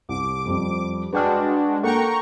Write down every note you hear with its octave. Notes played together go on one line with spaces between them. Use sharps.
C2 D6
F2 G3
G#3 D4 F#4 B4 G5 F6
A#3 A4 F#5 G5 A#5 C#6